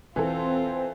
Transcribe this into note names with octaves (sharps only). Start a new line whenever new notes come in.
E1 E3 C4 F4 A4 C5